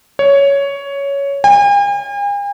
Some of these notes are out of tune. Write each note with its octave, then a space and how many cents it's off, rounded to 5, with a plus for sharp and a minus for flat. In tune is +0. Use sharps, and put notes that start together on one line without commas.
C#5 +10
G#5 -45